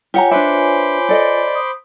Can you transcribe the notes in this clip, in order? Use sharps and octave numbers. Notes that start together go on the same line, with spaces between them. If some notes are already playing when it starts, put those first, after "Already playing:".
F4 G4 C#5 F#5 G#5 A#5
D4 B4 C5 E5 B5 D6
A4 D5 D#5
D#6